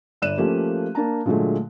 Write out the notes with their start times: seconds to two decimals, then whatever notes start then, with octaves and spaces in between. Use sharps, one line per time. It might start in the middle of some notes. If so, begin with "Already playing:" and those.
0.22 G1 D5 F#6 D#7 E7
0.38 F3 A3 A#3 C#4 G4
0.95 A#3 D4 A5 A#5
1.26 A#2 D3 F#3 G#3 A3